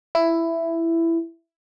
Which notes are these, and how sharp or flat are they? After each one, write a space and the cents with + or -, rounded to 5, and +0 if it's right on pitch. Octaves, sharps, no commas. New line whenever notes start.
E4 +10